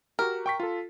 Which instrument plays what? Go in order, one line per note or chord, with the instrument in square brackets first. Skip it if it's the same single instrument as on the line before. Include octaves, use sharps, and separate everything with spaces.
[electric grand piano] F#4 G4 [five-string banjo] A#4
[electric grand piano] G5 C#6 B6
F4 A4